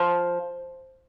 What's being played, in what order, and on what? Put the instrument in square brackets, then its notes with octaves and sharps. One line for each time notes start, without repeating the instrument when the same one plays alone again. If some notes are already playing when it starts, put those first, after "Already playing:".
Already playing: [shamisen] F3